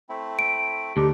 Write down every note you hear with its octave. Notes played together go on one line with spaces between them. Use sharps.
A3 C4 E4
D7
D2 D4 D#4 G4 A4